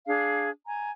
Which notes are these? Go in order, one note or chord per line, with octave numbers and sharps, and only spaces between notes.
D4 G#4 F5
G#5 A#5